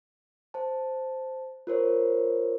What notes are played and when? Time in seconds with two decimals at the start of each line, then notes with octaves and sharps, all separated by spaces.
0.54 C5 A5
1.67 F4 A#4 C5 C#5